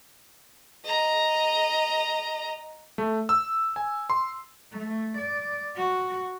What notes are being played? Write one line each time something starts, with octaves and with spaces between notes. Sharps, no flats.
D#5 A#5
A3
E6
G#5
C6
A3
D5
F#4